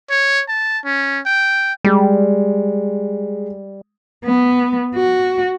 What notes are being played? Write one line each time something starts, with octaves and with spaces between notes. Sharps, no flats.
C#5
A5
C#4
G5
G3 G#3
B3
F#4